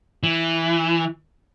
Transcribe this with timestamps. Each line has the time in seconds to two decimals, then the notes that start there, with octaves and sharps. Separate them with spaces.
0.23 E3